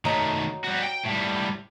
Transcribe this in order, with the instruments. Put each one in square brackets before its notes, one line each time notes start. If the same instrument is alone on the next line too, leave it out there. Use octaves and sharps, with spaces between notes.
[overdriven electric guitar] D#3 A3 [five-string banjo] F#3 D#4
[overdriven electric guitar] G3 F#4
G5
A2 G3